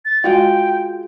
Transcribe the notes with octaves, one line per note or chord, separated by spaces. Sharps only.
A6
G#3 F4 F#4 G5